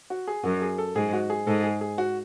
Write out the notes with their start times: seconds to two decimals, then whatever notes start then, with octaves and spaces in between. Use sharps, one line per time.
0.10 F#4
0.27 G#4
0.44 F#2 F#4
0.62 G#4
0.78 A4
0.96 G#2 G#4
1.13 F#4
1.30 G#4
1.47 G#2 A4
1.63 G#4
1.81 G#4
1.98 F#4